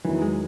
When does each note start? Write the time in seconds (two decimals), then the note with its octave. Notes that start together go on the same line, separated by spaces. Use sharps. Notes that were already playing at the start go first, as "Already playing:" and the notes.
0.05 E2 D#3 E3 F#3
0.22 G#3